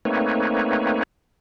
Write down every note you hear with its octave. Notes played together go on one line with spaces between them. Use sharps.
A3 A#3 C4 D#4 B4 C#5